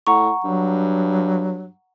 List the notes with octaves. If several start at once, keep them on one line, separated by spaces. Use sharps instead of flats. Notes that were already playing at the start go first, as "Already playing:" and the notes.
A2 F#5 A#5 C#6
G2 F#3